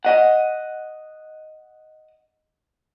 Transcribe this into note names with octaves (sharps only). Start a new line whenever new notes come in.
D#5 F#5